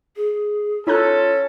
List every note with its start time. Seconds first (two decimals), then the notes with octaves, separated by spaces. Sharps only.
0.16 G#4
0.87 C#4 D#4 F4 A4 A#5 F#6